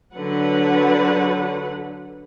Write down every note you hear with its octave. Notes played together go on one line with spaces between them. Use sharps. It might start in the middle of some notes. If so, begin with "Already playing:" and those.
D3 F#3 B4 F#5